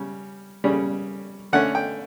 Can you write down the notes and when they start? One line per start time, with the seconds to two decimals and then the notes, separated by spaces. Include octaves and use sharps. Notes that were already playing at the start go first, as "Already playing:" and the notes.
Already playing: C#3 G3 C#4
0.64 C#3 G3 C#4
1.53 D3 A3 C#4 F#5
1.75 G5